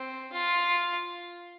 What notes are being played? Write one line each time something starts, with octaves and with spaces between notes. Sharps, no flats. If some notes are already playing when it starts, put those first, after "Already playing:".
Already playing: C4
F4